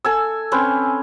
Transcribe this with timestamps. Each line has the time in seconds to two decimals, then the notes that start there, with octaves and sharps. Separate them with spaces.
0.04 A4 G#5 E6
0.52 C4 C#4 B4